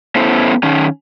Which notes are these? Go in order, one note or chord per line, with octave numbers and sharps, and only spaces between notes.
B3 C#4 E4 A4 C5
D#3 C#4